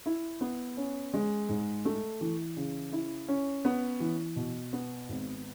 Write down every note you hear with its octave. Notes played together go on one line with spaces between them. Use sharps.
E4
B3
C#4
G#3
G#2
A3
E3
C#3
E4
C#4
B3
E3
B2
B3
G#1